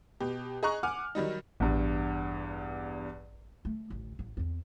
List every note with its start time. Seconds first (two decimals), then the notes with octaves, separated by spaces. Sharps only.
0.20 B2 G4
0.63 G#4 D#5 G#5 A#5 C#6 F#6
0.83 F#5 G#5 D6 F6
1.15 D#3 F#3 G3 D#4
1.60 A1 E2 G2
3.65 A3
3.90 A1 D2
4.19 A1
4.37 E2 C4